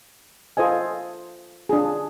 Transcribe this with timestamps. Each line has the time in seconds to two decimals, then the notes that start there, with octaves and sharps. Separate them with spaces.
0.57 F4 A4 C5 D#5 G#5
1.69 D4 F4 G#4